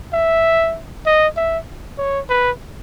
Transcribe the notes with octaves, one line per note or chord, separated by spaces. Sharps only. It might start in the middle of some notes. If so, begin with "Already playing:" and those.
E5
D#5
E5
C#5
B4